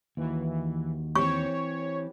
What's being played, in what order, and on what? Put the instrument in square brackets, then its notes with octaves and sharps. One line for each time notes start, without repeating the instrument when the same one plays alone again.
[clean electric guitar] D#2 F#4 [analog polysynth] E3
[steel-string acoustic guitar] E3 C4 G4 [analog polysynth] C#5 [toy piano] C#6